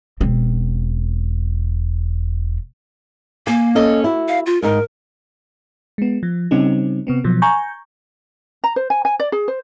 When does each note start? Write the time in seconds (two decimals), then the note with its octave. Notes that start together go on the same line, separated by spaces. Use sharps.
0.21 E1 C4
3.47 A#3 G#5
3.75 C#4 A4 D#5
4.04 E4 F#4
4.28 F5
4.46 F4
4.62 G#2 D#4 A#4
5.98 G#3 B3
6.23 F3
6.51 C#3 G3 C4 C#4 D#4
7.07 C3 B3 C4
7.24 B2 F3 F#3
7.42 G#5 A#5 C#6 G6
8.64 A#5
8.76 C5
8.90 G#5
9.05 G#5
9.20 D5
9.32 G#4
9.48 C5